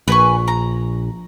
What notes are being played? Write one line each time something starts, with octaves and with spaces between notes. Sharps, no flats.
A#1 B4 G#5 C#6
A#5